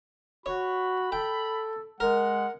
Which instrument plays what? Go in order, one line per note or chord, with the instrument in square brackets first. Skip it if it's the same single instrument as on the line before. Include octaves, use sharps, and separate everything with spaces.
[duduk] F#4 [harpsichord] C#5 [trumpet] B5
[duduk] A4 [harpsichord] G5
[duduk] G#3 [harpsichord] A#4 [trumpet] F#5